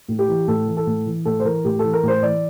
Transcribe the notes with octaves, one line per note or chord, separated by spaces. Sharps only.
A2
G4
E3
A2 A4
E3
A4
A2
E3
A2 A4
C5
E3 A#4
A2 G4
E3 A4
A#4
A2 C5
E3 D5